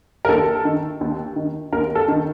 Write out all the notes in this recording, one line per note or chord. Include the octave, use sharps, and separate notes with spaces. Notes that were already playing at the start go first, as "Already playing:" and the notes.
A#4
D#2 A4
D#3
D#2
D#3
D#2 A#4
A4
D#3